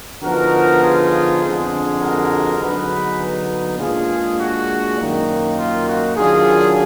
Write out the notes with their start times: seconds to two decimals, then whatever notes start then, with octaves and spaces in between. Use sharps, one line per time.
0.23 D3 F3 B3 D#4 F#4 A#4
0.82 F4 G#4
1.41 F2 D3 G#3
2.01 F#4 A#4
2.61 D3 F#3 B3 D#4 G#4 B4
3.79 A#2 G#3 D4 F4 G#4
4.39 F#4
4.98 F#2 D#3 A#3 D#4
5.58 F4
5.87 F#4
6.17 D#3 F#3 D4 F4 G#4